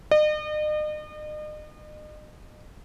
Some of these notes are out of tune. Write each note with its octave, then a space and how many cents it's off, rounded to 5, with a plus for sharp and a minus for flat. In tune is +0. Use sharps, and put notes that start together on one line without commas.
D#5 -40